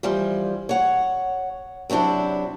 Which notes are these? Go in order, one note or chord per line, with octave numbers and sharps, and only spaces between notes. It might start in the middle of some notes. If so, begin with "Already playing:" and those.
E3 F3 G3
C#5 F#5
C3 F#3 C4 D4 E4